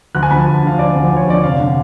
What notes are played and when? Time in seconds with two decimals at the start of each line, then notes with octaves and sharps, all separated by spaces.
0.15 D2 F#6
0.23 G#5
0.30 D3 F3 B5
0.39 A5
0.47 D2
0.63 D3 F3 F5
0.79 D2 D5
0.95 D3 F3
1.11 D2
1.16 C#5
1.27 D3 F3 D5
1.43 F1 F5
1.60 D3